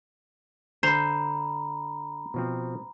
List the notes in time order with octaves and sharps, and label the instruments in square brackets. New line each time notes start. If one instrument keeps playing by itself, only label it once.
[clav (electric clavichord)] D3 [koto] C5 [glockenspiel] A#5 B5
[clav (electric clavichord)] B2 F3 C4